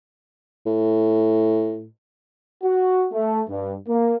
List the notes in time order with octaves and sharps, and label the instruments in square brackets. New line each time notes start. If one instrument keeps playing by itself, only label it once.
[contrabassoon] A2
[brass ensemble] F#4
A3
G2
A#3